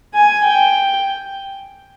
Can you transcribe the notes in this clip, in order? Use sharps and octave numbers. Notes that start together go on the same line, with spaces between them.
G#5
G5